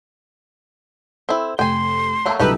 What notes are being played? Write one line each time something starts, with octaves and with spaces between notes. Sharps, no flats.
C4 E4 A4
F1 G5 G#5 C6
F#3 A3 A#3 A5 C#6
C2 D3 F#3 D#4 G4 A4 B4